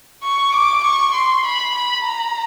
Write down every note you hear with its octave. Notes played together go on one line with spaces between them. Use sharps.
C#6
D6
C#6
C6
B5
B5
A#5